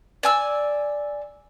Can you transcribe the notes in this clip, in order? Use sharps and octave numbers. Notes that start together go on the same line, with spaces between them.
D5 G#5 E6